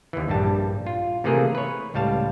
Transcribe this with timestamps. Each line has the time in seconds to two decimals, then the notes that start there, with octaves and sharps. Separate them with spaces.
0.13 D#2 E3
0.28 A#1 G2 G3 A5
0.86 F4
1.24 C3 E3 A3 A#3 G#4 A#4
1.55 B4 C#5
1.94 C#2 A2 G3 F5 A5